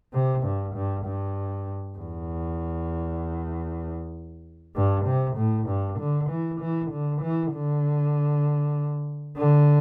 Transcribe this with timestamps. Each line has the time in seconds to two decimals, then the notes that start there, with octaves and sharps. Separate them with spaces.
0.13 C3
0.44 G2
0.75 G2
1.05 G2
1.98 E2
4.75 G2
5.05 C3
5.37 A2
5.68 G2
5.99 D3
6.29 E3
6.60 E3
6.91 D3
7.21 E3
7.53 D3
9.37 D3